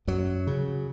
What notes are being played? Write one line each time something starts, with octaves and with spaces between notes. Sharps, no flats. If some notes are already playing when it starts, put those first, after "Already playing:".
F#2 F#3
C#3